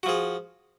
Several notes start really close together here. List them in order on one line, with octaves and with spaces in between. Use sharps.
F#4 F3 G#4